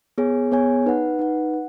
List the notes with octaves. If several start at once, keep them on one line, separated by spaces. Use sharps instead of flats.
B3 G#4 C#5 G#5
B3 G#4 C#5 G#5
D#4 B4 F#5
D#4 B4 F#5
F#5